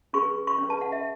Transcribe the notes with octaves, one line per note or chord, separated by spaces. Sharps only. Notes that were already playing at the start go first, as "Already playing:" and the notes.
C#4 G#4 B4 C#6
C#6
C#4 G#4 B4
A5
F#5
E5